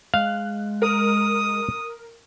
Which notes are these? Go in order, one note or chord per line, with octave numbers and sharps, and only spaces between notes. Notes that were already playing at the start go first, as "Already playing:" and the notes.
G#3 F5 F#6
A#4 D#6